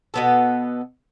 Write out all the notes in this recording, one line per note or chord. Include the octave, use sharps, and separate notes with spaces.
B2 B3 A4